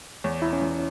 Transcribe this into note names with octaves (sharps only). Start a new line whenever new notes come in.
E2 C#5
E1 E4
C#4
E2